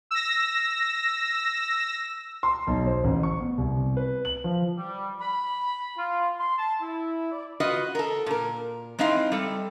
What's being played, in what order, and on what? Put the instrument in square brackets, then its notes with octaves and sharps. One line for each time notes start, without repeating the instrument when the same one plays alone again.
[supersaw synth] E6 A#6
[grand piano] C6
B1
C5
A1
C#6
B3
C2
B4
F#7
F3
[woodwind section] G3
B5
F4
C6
A5
E4
D5
[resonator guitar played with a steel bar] F4 F#4 B4 D#5
A4 A#4
A#2 A#4
G#3 C4 D#4 E4 F5
G3 A4